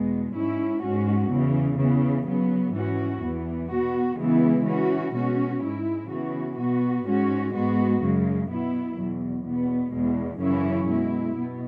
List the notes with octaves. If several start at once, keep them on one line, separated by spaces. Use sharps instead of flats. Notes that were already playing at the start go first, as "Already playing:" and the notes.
Already playing: E2 B2 G#3 B3
G#2 G#3 C#4 E4
G#2 G#3 C#4 F#4
E2 C#3 E3
C#3 E3 B3
C#3 F#3 B3
G#2 E3 C#4 F#4
E2 E3 B3
B2 B3 F#4
C#3 E3 G#3 B3 E4
E3 C#4 F#4
B2 G#3 C#4 F#4
G#2 G#3 E4
C#3 E3 B3 F#4
B2 B3 F#4
G#2 G#3 C#4 F#4
G#2 G#3 B3 F#4
F#2 C#3 G#3
B2 B3 E4
E2 B2 F#3
E2 B2 B3
E2 B2 G#3
F#2 C#3 E3 C#4 E4
B2 G#3 E4
B2 B3